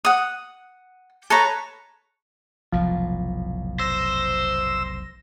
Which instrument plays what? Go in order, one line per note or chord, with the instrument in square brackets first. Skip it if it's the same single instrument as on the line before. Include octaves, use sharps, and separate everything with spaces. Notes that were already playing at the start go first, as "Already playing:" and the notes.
[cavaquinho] F#5 D#6
A4 B4 C#5 A#5
[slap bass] F1 B1 A2 [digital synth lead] F3
[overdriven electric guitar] C5 [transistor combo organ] E6 [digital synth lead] A#6